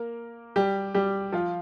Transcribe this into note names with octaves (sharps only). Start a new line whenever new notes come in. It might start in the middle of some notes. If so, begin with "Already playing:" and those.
Already playing: A#3 A#4
G3 G4
G3 G4
F3 F4